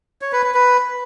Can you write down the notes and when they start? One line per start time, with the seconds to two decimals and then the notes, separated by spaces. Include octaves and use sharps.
0.22 C#5
0.32 B4
0.43 B4
0.54 B4